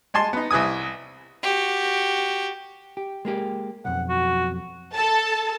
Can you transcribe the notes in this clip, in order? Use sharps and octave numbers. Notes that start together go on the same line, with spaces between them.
G#3 G#5 A5 C6
B3 D#4
C2 E4 B4 G#5 D#6
F#4 G4
G4
G#3 A#3 G4
B1 F2 F#5
F#4
A4 A5